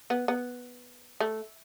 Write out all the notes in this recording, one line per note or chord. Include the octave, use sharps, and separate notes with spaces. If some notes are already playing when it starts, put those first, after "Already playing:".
B3
B3
A3